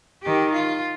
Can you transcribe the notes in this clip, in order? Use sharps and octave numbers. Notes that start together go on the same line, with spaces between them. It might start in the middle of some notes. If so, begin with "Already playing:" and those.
D#3 G4
F4